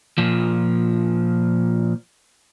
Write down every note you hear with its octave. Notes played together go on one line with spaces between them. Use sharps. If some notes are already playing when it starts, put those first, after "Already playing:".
A#2 F3